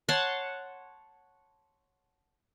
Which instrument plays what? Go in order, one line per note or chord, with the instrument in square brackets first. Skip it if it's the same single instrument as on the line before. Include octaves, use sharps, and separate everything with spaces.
[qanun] C#5 F#5 A5 C6